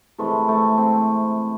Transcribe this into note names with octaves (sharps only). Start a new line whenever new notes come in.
C3 E3 G#3 A3
A3
C4